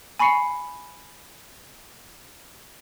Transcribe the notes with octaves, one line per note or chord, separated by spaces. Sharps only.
G#5 B5 C#6 C7 C#7